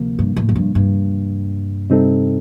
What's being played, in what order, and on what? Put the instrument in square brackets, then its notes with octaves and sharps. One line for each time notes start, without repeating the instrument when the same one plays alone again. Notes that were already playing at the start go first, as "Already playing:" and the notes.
Already playing: [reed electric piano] D2 C3 F3 A#3
[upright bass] G2
A2
F2
G2
G2
[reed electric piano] C3 G3 C4 D#4 A4